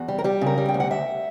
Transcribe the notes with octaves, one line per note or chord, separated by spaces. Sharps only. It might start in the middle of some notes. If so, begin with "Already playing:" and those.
Already playing: E2 F#4
G3
A#4
G3 G4
C#3 A#4
G3
G5
D2
F#5
D2 E5